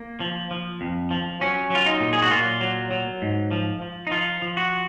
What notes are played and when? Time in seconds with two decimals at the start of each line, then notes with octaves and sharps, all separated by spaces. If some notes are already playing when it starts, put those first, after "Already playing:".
Already playing: A#3
0.20 F3
0.51 F3
0.81 F2
1.11 F3
1.41 F#3 C#4
1.70 F#3 F4
1.86 D#4
2.00 A#2
2.13 G#4
2.22 F#4
2.31 A#2 F4
2.61 F#3
2.91 F#3
3.22 G#2
3.51 F3
3.82 F3
4.07 D#4
4.11 F3 F4
4.42 F3
4.57 F#4